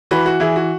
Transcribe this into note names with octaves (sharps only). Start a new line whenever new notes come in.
E3 F#4 B4
F#4
E3 E4 G#4
F#4